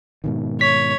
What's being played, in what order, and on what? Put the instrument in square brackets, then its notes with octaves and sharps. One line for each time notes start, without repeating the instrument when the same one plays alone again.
[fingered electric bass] G#2 B2 D#3
[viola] C#5 [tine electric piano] B6